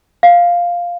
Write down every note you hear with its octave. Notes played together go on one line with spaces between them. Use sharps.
F5